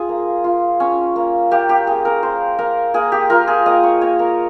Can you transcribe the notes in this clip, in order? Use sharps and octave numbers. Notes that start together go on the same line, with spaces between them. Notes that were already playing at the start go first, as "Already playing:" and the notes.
Already playing: F4 G#4
A#3
F4
C#4
A#3
A#3 G4
G4
A#3 G#4
A#4
A#3 C5
A#3 A#4
A#3 G#4
G4
F4 A#4
G#4
A#3 D#5
C#5
A#3 C#5
A#4